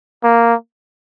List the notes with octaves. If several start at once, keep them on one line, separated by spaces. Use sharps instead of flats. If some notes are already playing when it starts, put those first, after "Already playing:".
A#3